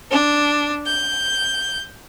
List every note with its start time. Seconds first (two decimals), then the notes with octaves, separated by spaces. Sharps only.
0.11 D4
0.85 G6